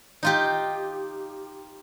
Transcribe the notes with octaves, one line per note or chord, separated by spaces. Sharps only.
D#4 F4 G4